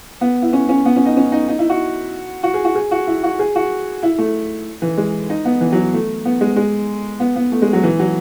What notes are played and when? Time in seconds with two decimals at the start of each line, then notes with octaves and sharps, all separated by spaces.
0.21 B3
0.42 E4
0.53 C#4
0.69 C#4
0.86 B3
0.96 C#4
1.06 D#4
1.17 C#4
1.32 D#4
1.48 D#4
1.59 E4
1.69 F#4
2.43 F#4
2.54 G#4
2.65 F#4
2.75 G#4
2.91 F#4
3.07 E4
3.23 F#4
3.39 G#4
3.55 F#4
4.03 E4
4.18 A3
4.82 E3
4.98 G#3
5.30 D#4
5.45 B3
5.61 E3
5.72 F#3
5.93 A3
6.25 B3
6.41 G#3
6.56 G#3
7.20 B3
7.36 B3
7.52 A3
7.62 G#3
7.73 F#3
7.83 E3
8.00 F#3